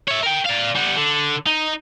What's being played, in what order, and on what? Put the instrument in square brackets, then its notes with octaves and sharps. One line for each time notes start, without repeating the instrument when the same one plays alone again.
[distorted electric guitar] C#5 E5
A#4 G5
D5 F5
G3 B3
D3
D#4